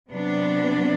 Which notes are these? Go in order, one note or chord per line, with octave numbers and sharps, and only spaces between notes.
C3 F#3 B3 D4